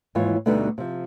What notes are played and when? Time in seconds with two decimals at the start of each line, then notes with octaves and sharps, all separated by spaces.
0.15 D#2 G#2 E3 F4 C#5
0.46 D2 B2 D3 G3 B3 D#4
0.78 C3 F3